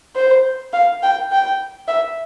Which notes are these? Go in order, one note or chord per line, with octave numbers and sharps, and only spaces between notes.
C5
F5
G5
G5
E5